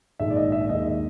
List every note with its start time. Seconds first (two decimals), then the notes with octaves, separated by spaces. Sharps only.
0.19 A#1 G#2 D#3 G#3 E5
0.30 D5
0.37 D#5
0.52 E5
0.69 D#2 D#3 G#3 D#5